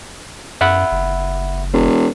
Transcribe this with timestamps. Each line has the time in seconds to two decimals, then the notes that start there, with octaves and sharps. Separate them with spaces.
0.61 F#2 E5 F#5 B5
0.92 F#1
1.73 E1